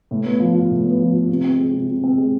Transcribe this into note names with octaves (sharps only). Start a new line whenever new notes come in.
A2
B3
F3
F4
A2
B3
F3
F4
C3
C4
G#3
C3
C3
C4
G#3